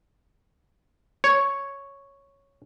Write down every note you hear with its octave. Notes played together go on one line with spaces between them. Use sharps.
C#5